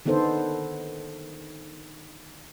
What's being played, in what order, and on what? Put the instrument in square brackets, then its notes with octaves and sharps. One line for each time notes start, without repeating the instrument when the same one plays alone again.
[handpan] D3 D#3 B3 D#4 A4 C5